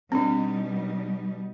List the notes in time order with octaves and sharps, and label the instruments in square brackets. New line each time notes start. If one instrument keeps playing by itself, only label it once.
[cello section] B2 G3 D#4 [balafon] C4 D4